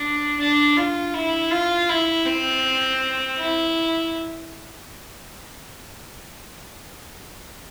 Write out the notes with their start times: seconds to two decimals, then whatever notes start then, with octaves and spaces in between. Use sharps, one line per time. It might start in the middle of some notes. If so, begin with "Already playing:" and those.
Already playing: D4
0.40 D4
0.77 F4
1.14 E4
1.51 F4
1.89 E4
2.26 C4
3.38 E4